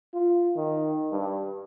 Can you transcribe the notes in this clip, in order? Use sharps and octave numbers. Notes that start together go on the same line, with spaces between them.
F4
D#3
G2